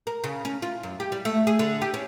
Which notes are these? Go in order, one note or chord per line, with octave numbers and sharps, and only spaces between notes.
A#4
C#3
C#4
F4
F#2
G4
G3
A3
G#4
D3
G4
C#4